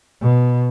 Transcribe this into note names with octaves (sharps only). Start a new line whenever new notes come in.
B2